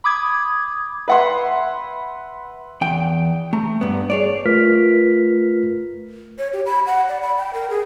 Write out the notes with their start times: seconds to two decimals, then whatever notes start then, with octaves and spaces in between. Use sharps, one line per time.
0.04 B5 D6 D#6 G#6
1.08 B4 E5 F#5 B5 C6
2.81 E2 G5
3.53 A3 A#5
3.81 G2 B3
4.10 G#4 C#5 D5
4.46 A3 F4 A#4 B4 F6 B6
6.38 C#5
6.53 G4
6.66 B5
6.86 F#5
7.09 D5
7.22 B5
7.38 G5
7.54 A#4
7.70 G#4